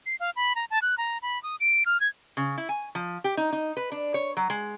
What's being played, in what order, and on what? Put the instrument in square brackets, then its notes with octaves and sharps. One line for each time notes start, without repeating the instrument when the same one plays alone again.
[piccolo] C7
F5
B5
A#5
A5
F#6
A#5
B5
D#6
D7
F6
G#6
[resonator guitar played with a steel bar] C#3
E4
G#5
F3
G4
D#4
D#4
B4
D4
C#5
F#3
G#3